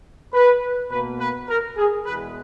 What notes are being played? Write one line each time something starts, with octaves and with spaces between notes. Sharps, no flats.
B4
B2 A#3 B4
B4
A#4
G#4
E2 B2 G#3 B4